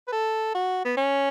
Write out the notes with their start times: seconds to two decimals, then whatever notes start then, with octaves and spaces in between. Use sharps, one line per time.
0.08 B4
0.12 A4
0.55 F#4
0.85 B3
0.97 C#4